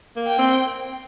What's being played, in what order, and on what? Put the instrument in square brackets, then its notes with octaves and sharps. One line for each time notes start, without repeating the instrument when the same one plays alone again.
[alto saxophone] A#3
[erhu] G5
[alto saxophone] C4